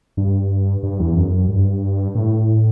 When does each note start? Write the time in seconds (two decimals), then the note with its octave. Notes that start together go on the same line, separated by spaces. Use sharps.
0.17 G2
0.83 G2
1.00 E2
1.16 F#2
1.49 G2
2.15 A2